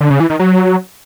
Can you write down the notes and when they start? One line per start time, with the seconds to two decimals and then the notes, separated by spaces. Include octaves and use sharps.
0.01 D3
0.10 C#3
0.20 E3
0.30 D#3
0.40 F#3